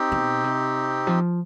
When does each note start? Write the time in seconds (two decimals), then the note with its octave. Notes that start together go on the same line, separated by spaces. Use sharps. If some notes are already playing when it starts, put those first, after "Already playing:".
Already playing: C4 D#4 G4
0.12 B2
0.44 C3
1.07 F3